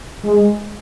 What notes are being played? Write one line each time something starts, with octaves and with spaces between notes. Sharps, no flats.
G#3